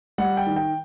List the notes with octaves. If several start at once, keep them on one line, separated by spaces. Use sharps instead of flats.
G3 F#5
G5
D#3
G5